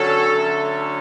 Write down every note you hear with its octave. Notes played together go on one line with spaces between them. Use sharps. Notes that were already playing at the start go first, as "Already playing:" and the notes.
Already playing: D3 F#3 C#4 A4
D3 F#3 A3 C#4